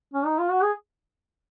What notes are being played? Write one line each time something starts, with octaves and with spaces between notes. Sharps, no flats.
C#4
D#4
F4
F#4
G#4